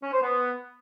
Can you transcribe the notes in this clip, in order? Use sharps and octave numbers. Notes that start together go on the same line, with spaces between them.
C#4
C5
B3